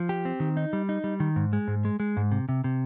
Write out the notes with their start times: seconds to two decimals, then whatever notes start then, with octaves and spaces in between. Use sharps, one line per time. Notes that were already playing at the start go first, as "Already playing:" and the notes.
Already playing: F3
0.09 G4
0.25 C4
0.40 D#3
0.57 D#4
0.73 G3
0.89 D#4
1.04 G3
1.20 D#3
1.36 G#2
1.53 G#3
1.68 G#2
1.85 G#3
2.00 G#3
2.17 G#2
2.32 C3
2.49 C3
2.64 C3